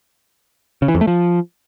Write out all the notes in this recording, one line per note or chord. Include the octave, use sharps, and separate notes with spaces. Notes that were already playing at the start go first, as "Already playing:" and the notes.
C#3
E3
F2
A3
F3